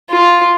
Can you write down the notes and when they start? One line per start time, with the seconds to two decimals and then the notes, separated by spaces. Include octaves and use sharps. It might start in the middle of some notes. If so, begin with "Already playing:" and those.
0.11 F4